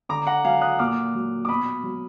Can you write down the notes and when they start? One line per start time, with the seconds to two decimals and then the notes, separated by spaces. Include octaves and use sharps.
0.09 D3 A#5 D6
0.27 F#5 A#5
0.44 F#3 F5 G#5
0.61 D#6 F#6
0.79 A#2 D6 F6
1.15 F#3
1.45 D6
1.49 B2 B5 D#6
1.83 F#3